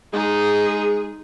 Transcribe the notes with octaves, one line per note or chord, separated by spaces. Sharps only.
G#3 D#4 G#4